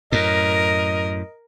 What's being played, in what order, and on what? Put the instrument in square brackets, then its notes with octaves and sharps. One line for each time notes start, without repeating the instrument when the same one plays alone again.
[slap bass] F#2 A2 [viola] A#4 [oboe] D#5